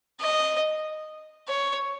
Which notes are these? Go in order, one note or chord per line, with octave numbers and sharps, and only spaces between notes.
D#5
C#5